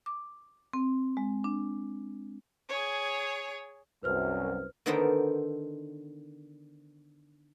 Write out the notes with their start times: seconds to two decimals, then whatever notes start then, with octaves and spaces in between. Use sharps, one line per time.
0.06 D6
0.73 C4
1.17 G#3
1.44 D4
2.69 G#4 C#5
4.03 C2 F#2 B4 C5 F6
4.86 D3 D#3 B3 A4 A#4 C5